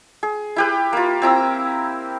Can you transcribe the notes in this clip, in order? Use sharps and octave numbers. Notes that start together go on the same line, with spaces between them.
G#4
E4 G4 B4
A#3 F4
C4 E4 A#5 E6